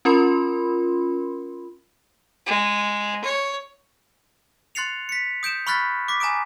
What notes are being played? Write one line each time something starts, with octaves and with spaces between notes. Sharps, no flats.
C#4 F4 A#4 B5 C6
G#3
C#5
C6 F#6 A6 C7 C#7 F7
B6 C#7
D#6 G6 D7 E7
B5 C#6 F6 F#6 A6 B6
D6 B6
G#5 A#5 D6 D#6 D7